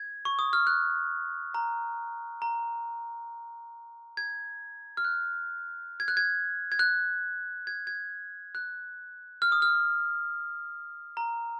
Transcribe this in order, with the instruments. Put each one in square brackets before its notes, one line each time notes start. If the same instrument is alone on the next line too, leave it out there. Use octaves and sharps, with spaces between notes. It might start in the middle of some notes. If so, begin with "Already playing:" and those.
Already playing: [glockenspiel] G#6
C#6
D#6
F6
F#6
A#5
A#5
G#6
F6
F#6
G#6
F#6
G#6
G#6
F#6
G#6
G#6
F#6
F6
D#6
F6
A#5